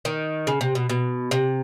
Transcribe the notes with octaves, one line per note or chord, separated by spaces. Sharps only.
D#3
C#3
C3
B2
B2
C3